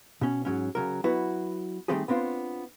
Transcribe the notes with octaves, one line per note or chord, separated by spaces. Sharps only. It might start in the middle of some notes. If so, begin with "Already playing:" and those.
B2 C#4
G#2 F#3 C#4
C#3 F#3 A#4
F#3 B3 E4 F#4 B4
D#3 G3 A3 C4 G4 G#4
B3 C4 D4 F4 C5